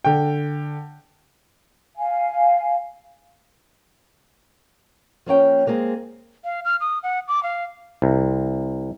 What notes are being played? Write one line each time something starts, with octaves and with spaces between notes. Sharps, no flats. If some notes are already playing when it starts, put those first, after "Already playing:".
D3 G5
F5 G#5
F3 A#3 C#4 G5
G#3 A#3 C4 G#4
F5
F6
D#6
F#5
D6
F5
C2